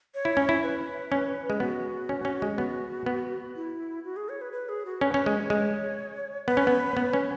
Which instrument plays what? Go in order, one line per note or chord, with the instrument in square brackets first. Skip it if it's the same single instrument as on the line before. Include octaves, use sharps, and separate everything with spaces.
[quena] C#5
[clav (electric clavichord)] E4
C#4
E4
[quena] B4
[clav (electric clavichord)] C#4
G#3
[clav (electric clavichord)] B3 [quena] F#4
[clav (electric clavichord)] C#4
C#4
G#3
[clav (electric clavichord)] B3 [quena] F#4
[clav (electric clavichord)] B3
[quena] E4
F#4
G#4
C#5
B4
B4
G#4
F#4
[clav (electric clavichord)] C#4 [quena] B4
[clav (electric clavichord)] C#4
[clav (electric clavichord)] G#3 [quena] C#5
[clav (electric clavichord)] G#3 [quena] C#5
[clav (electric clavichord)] B3 [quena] B4
[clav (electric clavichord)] C#4
B3
B3
C#4